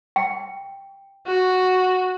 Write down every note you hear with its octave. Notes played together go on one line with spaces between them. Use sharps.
G5
F#4